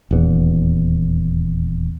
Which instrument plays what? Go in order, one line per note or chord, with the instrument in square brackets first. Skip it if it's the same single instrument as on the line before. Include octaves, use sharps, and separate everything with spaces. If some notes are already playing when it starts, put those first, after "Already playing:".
[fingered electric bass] D#1 E2